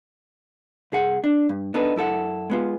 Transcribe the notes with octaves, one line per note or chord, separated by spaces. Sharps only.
C2 G#4 F#5
D4
G2
B3 D4 D#4 A4 B4
F#2 E4 A4 F#5
G#3 B3 F4